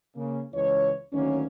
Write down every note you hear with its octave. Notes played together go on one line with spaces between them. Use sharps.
C#3 A#3
C#2 E3 C#5
D2 D#3 F#3 A#3 C#4